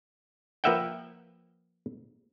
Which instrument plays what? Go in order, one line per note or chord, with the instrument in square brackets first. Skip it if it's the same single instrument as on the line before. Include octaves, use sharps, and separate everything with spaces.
[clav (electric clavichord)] F3 A#3 B4 E5 F#5 G5